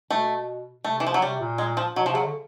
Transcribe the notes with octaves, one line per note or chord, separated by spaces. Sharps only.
B2 A3
C3 A3
E3
F3
F#3
C3 G3
A#2
G#3
F3
B2 F#3
C3 F3
C#3 F#3
D3